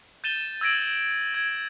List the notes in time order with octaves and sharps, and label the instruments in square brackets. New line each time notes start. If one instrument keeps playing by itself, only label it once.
[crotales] G6 A6 D#7 E7 G7
E6 G#6 A#6 D7 F#7
G#6